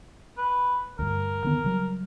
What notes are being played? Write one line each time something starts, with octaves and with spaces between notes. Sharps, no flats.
B4
D2 G2 A#4
D3 D#3 B3
C#3 F#3 G3